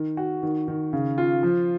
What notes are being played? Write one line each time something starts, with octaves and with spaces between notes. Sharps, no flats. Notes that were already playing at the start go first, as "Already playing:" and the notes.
Already playing: D#3
F#4
D#3
D#3
C#3
F4
F3